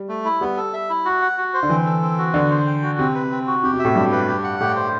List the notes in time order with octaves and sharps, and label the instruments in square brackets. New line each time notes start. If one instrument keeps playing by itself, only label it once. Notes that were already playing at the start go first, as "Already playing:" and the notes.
Already playing: [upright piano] G3
[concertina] A3
E4
[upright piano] G3 [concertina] B3
[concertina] A4
E5
E4
F#4
F#5
F#4
C5
[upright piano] D3
[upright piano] E3 [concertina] C4
[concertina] A4
C4
F#4
[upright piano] D3 [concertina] B3
[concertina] C5
G5
F#4
[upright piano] C3 [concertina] C4
[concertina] B4
C4
F#4
[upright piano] C3 [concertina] G4
[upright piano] B2
[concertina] E5
[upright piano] A2
[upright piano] G2 [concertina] G4
[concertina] B4
G4
F#5
[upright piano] A2 [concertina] G4
[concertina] C5